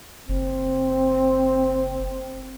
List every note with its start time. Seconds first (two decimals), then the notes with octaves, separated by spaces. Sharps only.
0.29 F#1 C4